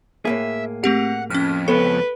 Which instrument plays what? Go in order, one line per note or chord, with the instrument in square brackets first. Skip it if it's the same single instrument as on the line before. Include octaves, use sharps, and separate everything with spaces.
[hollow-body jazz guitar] A2 A#3 G#4 [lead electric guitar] E5
[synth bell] A3 C4 G4 [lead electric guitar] F#5
[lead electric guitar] F2 [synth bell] C#4 F6
[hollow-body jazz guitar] C#2 B3 C#5 [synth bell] A4 [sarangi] B4